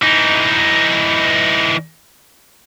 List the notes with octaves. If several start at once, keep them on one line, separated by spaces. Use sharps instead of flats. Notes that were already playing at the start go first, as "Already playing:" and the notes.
E3 D#4